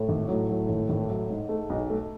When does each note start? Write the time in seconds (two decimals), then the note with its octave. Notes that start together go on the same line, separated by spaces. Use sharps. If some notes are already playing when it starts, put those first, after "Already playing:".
Already playing: A2
0.09 G#1
0.29 A2 F#3
0.49 F#3
0.69 G#1
0.89 G#1
1.10 F#3
1.30 G#2
1.49 G#2 A3
1.70 B1
1.90 A3